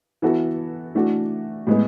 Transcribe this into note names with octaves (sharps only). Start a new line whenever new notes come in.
E3 B3 F#4 A4
E3 A3 D4 F#4
A2 G#3 B3